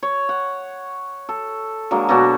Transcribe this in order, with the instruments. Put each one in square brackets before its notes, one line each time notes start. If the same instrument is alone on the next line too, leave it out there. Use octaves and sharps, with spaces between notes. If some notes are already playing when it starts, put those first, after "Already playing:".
[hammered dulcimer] C#5
F#5
A4
D3 F#3 G#3 A#3
B2 F#3 D4 F#4